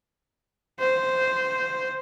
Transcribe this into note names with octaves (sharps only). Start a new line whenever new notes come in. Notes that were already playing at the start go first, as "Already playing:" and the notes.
C5